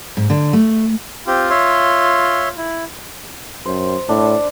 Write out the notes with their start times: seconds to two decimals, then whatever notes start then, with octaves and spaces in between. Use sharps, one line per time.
0.17 G#2
0.30 D3
0.53 A3
1.27 C4 F4 G4
1.50 C#5 E5 C6
2.57 E4
3.66 F#2 C5
4.09 A2 D4